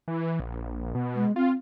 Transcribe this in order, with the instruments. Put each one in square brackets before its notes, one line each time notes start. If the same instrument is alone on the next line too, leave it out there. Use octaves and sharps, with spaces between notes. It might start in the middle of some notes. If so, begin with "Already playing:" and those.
[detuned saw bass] E3
A#1
B2
[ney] G#3
[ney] C4 [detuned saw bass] F4